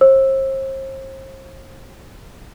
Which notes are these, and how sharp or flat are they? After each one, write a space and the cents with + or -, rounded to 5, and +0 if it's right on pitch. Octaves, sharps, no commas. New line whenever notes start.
C5 +40 E6 +0